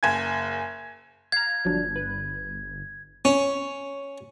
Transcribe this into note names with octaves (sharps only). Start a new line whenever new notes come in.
F#1 G#5 G#6
F5 A#5 G#6
G1 F3 F#3 D4
B4
C#4